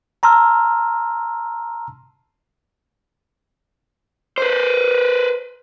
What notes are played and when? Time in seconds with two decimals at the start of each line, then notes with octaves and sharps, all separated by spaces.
0.23 A5 A#5 C6 E6 F6
4.38 B4 C5